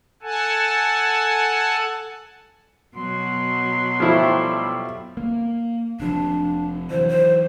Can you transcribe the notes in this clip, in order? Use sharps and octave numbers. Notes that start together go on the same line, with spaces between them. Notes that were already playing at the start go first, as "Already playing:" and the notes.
A4 F#5 G#5 A5
B2 F#3 C6
F3 G3 A3 E4
A#3
F1 C3 F3 D4
E3 F#3 C5
C5